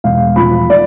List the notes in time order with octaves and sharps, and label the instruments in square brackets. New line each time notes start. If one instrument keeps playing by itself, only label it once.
[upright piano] E1 F5
F3 B5
D5